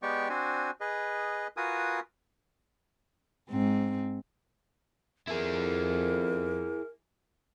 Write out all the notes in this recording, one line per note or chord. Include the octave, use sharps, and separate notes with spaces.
G#3 B3 G4 D5 G5 C#6
C4 D4 F#4 C5 G#5
G#4 B4 D#5
F4 F#4 A#4 B4 G#5 D#6
G#2 C4
F2 E4 G#4 A#4